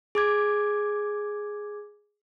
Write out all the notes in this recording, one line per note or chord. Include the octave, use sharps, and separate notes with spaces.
G#4 D6 G#6